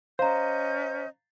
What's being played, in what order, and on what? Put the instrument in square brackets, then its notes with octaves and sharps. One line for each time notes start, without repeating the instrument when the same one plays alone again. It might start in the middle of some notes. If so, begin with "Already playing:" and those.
[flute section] C#4 D#5 G6 [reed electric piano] C5 [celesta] F5 A#5